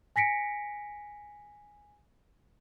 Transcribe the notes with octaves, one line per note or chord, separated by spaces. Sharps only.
G#5 A#6 B6 C#7 D7